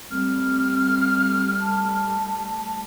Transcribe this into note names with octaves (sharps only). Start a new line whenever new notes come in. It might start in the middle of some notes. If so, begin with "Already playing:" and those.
G3 A3 C4 F6
A5